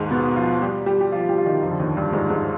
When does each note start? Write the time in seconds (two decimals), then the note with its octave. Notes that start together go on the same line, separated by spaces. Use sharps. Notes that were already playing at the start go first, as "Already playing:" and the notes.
Already playing: D#2 G#2 D#3 G#3
0.11 B2 B3
0.36 F3 F4
0.62 G3 G4
0.86 G3 G4
1.01 G4
1.12 F3 F4
1.29 G3 G4
1.38 F4
1.46 D#3 D#4
1.62 F2 F3
1.71 D3
1.79 D#2 D#3
1.97 G2 G3
2.13 G#2 G#3
2.30 G#2 G#3